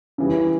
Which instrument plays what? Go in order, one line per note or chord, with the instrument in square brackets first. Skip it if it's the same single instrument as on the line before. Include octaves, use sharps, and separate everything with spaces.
[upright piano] C#3 E3 G3